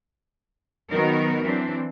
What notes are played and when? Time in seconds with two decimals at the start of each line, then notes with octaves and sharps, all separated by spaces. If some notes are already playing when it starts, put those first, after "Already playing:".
0.89 D#3 F#3 B3 D#4 F#4 A#4
1.43 E3 F#3 C4 D4